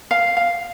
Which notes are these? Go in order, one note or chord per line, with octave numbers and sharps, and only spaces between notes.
F5
F5